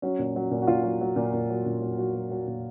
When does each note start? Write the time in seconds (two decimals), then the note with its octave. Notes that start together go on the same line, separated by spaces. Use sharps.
0.02 F#3 C#4
0.19 A#2
0.36 F#3
0.51 A#2
0.62 F#4
0.67 A#2 F4
0.84 F#3
1.01 F#3
1.16 A#2
1.33 A#2
1.50 F#3
1.66 A#2
1.82 F#3
1.98 F#3 F#4
2.14 F#3
2.31 F#3
2.47 A#2